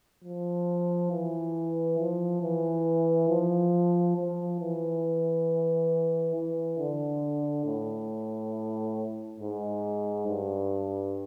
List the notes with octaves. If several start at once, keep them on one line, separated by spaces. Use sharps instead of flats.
F3
E3
F3
E3
F3
F3
E3
E3
D3
A2
G#2
G2